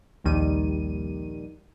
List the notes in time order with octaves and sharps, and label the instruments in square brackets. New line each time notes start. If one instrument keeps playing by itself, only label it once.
[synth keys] A#1 D#2 D#3 G3 D#7